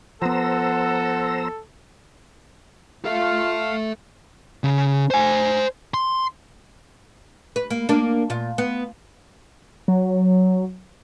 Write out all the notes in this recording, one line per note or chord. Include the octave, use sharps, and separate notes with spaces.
F3 B3 A4 C5 F#5 A#5 E6
F4 A4 E5 F5
C#3
C5 G#5
C6
B4
A#3
A#3 D4
A#2 F4
B3
F#3